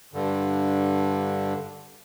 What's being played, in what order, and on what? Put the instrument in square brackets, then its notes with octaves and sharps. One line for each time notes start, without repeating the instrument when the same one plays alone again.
[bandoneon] G2 D3